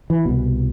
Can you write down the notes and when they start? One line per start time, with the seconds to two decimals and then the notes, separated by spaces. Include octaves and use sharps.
0.10 E3
0.25 C2 B2